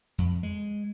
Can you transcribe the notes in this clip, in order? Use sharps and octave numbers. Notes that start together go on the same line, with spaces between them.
F2
G#3